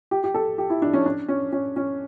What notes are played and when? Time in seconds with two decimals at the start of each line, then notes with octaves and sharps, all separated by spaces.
0.11 G4
0.24 G4
0.34 A4
0.58 G4
0.70 E4
0.82 D4
0.93 C#4
1.06 D4
1.28 C#4
1.52 C#4
1.76 C#4